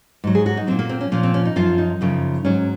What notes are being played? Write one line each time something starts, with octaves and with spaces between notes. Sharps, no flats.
G#2 F#3
G#4
F#4
D#4
A#2 F#3 C4
A#3
C4
C#4
A#2 F3 C#4
C4
C#4
D#4
F#2 F3 F4
D#4
F#2 C#3 F3
G#2 F#3 C#4